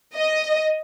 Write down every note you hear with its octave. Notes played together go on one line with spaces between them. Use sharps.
D#5